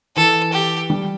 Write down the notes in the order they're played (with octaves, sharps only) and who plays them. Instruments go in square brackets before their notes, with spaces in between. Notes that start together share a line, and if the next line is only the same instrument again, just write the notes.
[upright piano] E3 [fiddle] A4
[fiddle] G4
[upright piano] G3